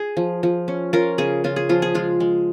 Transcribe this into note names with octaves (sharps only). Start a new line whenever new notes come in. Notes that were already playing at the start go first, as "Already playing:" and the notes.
Already playing: G#4
F3
F3
C#4
C#4 F4 A#4
C#3 G#4
C#3 F4
G#4
F3 F4
G#4
G#3 F4
G#3